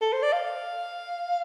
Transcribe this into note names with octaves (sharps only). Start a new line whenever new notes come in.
A4
C5
D5
F5